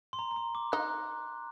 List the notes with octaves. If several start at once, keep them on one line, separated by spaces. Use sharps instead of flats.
C6
A#5
A#5
C6
D6
D#4 F#6